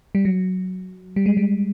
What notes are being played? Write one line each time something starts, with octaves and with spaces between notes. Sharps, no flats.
G3
F#3
G3
G#3
G3